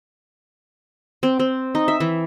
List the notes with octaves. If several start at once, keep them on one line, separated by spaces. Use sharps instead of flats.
C4
C4
D#4
E5
E3